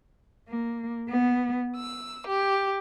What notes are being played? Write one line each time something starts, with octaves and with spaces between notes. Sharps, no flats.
A#3
B3
E6
G4